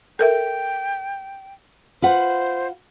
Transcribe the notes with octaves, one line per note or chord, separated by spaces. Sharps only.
A4 A#4 E5 G5
F4 B4 C5 F#5